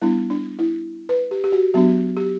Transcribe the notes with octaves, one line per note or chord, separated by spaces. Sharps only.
G3 B3 D4 E4
D4
E4
B4
G4
G4
F#4
F#3 B3 D4 F#4
G4